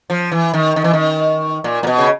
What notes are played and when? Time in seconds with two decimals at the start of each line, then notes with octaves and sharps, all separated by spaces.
0.10 F3
0.32 E3
0.54 D#3
0.76 D#3
0.84 E3
0.93 D#3
1.64 A#2
1.83 A#2
1.87 B2
1.98 C#3